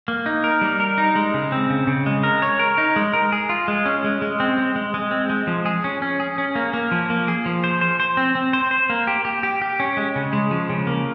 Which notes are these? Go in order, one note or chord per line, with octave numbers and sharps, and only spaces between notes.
A#3
D#4
A#4
G3
A#4
D#4
G#3
C#3
C4
C#3
C#3
G#3
A#4
C#5
A#4
D#4
G#3
A#4
G#4
F4
G#3
C#4
G#3
G#3
C4
G#3
G#3
G#3
C4
G#3
F3
G#4
C#4
C#4
G#4
C#4
A#3
A#3
F3
A#3
G#4
F3
C5
C5
C5
C4
C4
C5
C5
A#3
G4
G4
G4
G4
C#4
G#3
C#3
G#3
F3
C#3
A#3